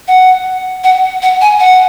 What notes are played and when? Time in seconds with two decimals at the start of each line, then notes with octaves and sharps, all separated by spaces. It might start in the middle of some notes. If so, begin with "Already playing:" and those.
0.08 F#5
0.84 F#5
1.22 F#5
1.41 G#5
1.60 F#5